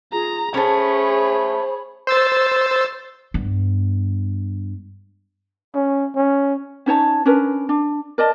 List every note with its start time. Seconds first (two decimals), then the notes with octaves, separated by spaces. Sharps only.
0.13 F4 G#4 A#5
0.54 A3 C#4 G#4 C5 C#5 B5
2.07 C5 E6 A6
3.34 G2 B3
5.75 C#4
6.16 C#4
6.86 C#4 D#4 C#5 A5
7.25 C#4 D4 A#4 B4
7.69 D4
8.18 A#4 D5 D#5 A5